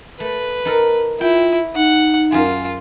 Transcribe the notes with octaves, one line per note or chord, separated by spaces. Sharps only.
A3 B4
D#4 A4 A#4
E4 F4 G5
D#4 F#5
F#2 F4 G#4